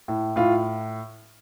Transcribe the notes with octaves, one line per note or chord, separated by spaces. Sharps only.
A2
A2 F4